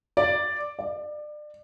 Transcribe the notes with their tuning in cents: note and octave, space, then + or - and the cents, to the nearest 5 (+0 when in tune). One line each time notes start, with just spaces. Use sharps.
D5 +5
D5 +30